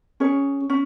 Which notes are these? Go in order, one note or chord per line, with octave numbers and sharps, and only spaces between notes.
C#4 G#4 C#5
C#4